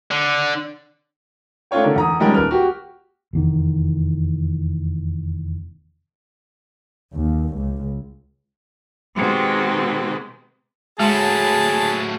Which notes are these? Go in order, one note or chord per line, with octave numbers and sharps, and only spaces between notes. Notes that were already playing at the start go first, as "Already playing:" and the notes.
D3
A3 D4 F4 C#5 G5
D3 A3 A#4
E2 A#5 D#6
D#3 F3 G3 G#3 C#4 A#4
D#1 A#4 B4 F6
F#4 G4
F1 E2 D#3
D#2
C#2
B2 D#3 G#3 C4 G4
A2 F#3 G#3 G#4 A5 C6